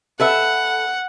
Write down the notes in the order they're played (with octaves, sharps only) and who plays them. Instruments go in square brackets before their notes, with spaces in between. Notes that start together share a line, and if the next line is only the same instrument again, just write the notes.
[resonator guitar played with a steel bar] A4 B4 E5 [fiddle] F#5